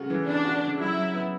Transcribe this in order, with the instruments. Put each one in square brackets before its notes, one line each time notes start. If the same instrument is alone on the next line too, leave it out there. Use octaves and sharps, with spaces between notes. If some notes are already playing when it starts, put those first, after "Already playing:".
Already playing: [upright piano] C#3 A3 F#4
E3
[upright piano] B3 [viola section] D4
[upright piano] F#4
C#3
[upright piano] F#3 [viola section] E4
[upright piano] F#3
B3